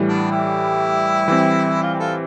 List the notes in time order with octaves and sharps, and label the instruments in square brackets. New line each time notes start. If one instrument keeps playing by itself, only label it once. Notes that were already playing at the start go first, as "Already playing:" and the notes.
Already playing: [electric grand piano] A2 E3 G3
[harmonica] B3 D4
E4 G4
[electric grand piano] E3 G3 C4
[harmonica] F4
G4
F4 A4